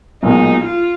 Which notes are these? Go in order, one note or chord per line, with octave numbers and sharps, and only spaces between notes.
B1 A#2 G#3 D#4
F4